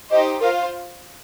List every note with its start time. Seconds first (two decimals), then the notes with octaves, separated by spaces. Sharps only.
0.09 D#4 G4 C5 D#5
0.40 F4 A#4 C5 F5